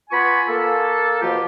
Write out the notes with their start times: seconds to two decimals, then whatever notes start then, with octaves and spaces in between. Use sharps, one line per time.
0.10 B3 F4 G#5 B5 C#6
0.48 A#3 A4
1.21 B2 F3 F4 G4